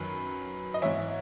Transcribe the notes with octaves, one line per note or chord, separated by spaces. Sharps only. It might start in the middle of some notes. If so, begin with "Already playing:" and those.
Already playing: F#2 D#3 F#3 B4
D#5
G#2 E3 C#5 E5